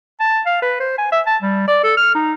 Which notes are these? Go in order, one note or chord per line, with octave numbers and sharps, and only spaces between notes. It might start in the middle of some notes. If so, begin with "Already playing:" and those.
A5
F5
B4
C5
G#5
E5
A5
G3
D5
A4
F6
D#4